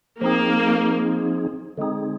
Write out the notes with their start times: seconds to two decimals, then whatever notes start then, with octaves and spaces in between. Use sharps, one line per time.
0.21 F3 A#3 C4 D#4 G#4
1.77 D3 G#3 C4 D#4 G#4